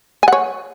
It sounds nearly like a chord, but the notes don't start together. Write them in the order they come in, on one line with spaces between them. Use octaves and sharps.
G#5 F#5 C#5